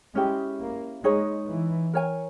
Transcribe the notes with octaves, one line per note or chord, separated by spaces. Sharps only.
G#3 C#4 E4 G4
A#3
G#3 D#4 G#4 C#5
E3
A#4 C#5 G#5